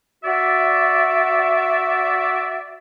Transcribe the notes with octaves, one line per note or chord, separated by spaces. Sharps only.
F#4 D5 E5